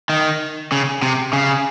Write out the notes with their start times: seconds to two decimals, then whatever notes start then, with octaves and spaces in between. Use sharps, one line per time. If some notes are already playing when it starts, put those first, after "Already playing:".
0.09 D#3
0.72 C#3
1.02 C3
1.33 C#3